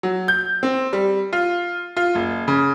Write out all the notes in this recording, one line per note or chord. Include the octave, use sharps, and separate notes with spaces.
F#3
G6
C4
G3
F4
F4
F#1
C#3